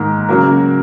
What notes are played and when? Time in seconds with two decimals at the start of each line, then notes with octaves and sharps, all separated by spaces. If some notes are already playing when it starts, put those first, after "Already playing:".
Already playing: G#2 D#3 A#3
0.29 C#3 F#3 A#3 F#4 A#4